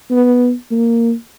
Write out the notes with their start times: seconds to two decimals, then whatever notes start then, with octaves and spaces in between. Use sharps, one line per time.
0.10 B3
0.71 A#3